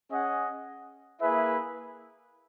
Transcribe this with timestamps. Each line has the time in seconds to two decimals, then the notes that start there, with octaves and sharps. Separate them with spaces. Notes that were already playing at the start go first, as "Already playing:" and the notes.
0.11 C#4 G#4 D#5 F#5
1.20 A#3 E4 G#4 B4 E5